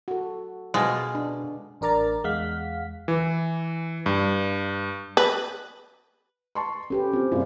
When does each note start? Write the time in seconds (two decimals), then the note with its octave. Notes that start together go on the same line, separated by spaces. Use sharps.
0.08 F#4 A4
0.74 B2 G#3 F4
1.15 D4
1.81 A1 D4 A#4 D5 A#5 A6
2.24 E2 G#3 F5 F#5 B6
3.08 E3
4.06 G2
5.17 B4
6.55 A5 C6 C#6
6.90 C#4 G4 A4 B4
7.13 C4 F4 G4
7.32 F#2 A2 C3 F4 G#4 D5